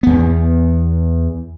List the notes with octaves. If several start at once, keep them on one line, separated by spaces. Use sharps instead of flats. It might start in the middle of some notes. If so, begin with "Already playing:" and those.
E2 B3